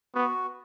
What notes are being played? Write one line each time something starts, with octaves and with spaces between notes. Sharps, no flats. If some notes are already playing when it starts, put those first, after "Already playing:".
B3 F#4